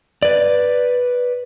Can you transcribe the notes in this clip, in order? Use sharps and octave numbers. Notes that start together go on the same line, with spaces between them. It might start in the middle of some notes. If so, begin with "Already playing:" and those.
B4 D5